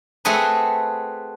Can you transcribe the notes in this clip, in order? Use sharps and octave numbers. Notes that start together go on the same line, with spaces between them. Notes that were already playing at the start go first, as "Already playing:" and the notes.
A3 C4 F#4 G#4 B4